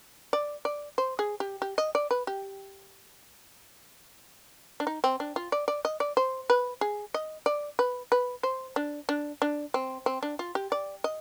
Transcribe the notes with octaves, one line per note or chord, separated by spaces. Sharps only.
D5
D5
C5
G#4
G4
G4
D#5
D5
B4
G4
D4
D#4
C4
D4
F4
D5
D5
D#5
D5
C5
B4
G#4
D#5
D5
B4
B4
C5
D4
D4
D4
C4
C4
D4
F4
G4
D5
D#5